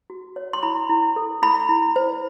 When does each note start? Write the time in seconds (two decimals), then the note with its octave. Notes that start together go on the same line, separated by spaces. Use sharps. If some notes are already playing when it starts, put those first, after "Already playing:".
0.10 F#4
0.36 C#5
0.53 C6
0.63 E4 B5
0.89 E4
1.16 A4
1.42 E4 B5
1.69 E4
1.96 C5